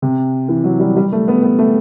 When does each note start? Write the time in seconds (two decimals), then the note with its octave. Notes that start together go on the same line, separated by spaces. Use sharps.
0.02 C3
0.48 E3
0.64 F#3
0.80 G3
0.97 G3
1.12 A3
1.28 B3
1.43 B3
1.59 A3